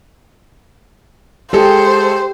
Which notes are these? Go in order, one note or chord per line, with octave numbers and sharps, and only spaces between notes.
G#3 G4 A4 C5